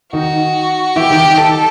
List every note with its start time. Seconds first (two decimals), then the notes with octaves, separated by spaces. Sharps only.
0.13 D#3 D#4 F#4
0.96 E3 E4 G4
1.10 D#3 D#4
1.23 D#3 D#4
1.37 D#3 D#4 A4